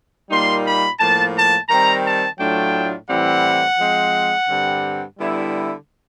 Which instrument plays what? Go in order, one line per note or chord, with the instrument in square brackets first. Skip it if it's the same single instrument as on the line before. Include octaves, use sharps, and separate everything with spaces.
[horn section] A#2 G3 A#3 D#4 C6
B5
A2 F3 A#3 A5
A5
D#3 G3 C4 A#5
A5
A2 F#3 A3 D4 F4 G5
A2 E3 G3 C4 E4 F#5
F3 G#3 C4
G2 D3 G3 C4
D3 G3 B3 E4